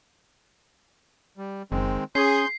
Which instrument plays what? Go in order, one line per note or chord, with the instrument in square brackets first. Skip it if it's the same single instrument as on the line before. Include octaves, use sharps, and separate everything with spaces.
[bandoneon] G3
[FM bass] F#1 [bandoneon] D#3 G#3 C4
[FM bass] C#4 [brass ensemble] G#4 [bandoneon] C6 G6 [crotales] C7